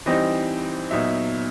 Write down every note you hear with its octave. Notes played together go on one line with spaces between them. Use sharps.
E3 G3 C4 D#4 D#5
A#2 F#3 B3 D#4 E5